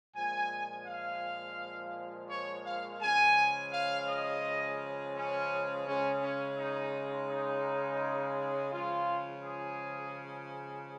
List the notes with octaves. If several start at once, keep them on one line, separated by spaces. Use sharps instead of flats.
A#2 F3 G#3 G#5
F5
C#5
F5
C#3 F3 G#3 G#5
F5
D#5
C#4
C#3 G#3 C#4
C#4
D#4
D#4
C#3 F3 G#3 F4
G#4